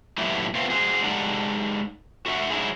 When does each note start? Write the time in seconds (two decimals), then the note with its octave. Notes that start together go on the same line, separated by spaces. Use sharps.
0.18 A#2 F#3 A3 B3 E4 G4
0.55 A3 B3 C4 F4
0.70 F#4 G#4 C5
1.04 G#3 D#4 G4 A4 D5 F#5
2.26 F#4 A4 E5 F#5
2.50 F#3 D#4 E4 G#4